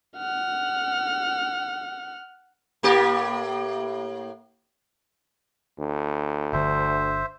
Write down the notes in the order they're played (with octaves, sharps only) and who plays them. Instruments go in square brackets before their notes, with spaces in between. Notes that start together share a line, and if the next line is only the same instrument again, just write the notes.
[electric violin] F#5 F6
[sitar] A2 A#3 G4
[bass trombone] D2
[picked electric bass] G1 D3 [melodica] C5 E5